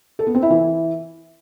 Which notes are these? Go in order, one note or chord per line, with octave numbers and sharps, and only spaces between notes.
A4
B3
C4
E4
E3